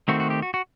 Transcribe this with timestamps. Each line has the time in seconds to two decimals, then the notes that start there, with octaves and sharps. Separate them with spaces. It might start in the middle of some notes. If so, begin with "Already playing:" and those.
0.08 D#3 A3 C4 F#4
0.20 F#4
0.30 G4
0.42 F#4
0.54 F#4